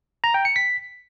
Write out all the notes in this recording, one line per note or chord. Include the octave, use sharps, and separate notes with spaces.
A#5
G5
C#7
B6